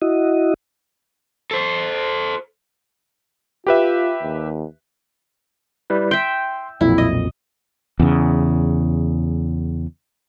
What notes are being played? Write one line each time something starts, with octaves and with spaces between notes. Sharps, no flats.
E4 F#4 D#5
A4 C5
F4 G4 B4 E5
D#2
G3 E4 B4
E5 G5 C6
B1 F2 A#2 E4
D#5
E2 C#3